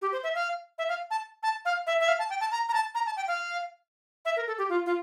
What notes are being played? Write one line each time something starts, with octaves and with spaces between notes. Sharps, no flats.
G4
C5
E5
F5
E5
F5
A5
A5
F5
E5
E5
F5
A5
G5
A5
A#5
A#5
A5
A#5
A5
G5
F5
E5
A#4
A4
G4
F4
F4